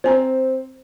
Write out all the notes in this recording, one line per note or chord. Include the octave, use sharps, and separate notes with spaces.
C4 C5 G#5 A#5